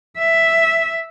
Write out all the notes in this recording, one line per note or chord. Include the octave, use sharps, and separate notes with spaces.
E5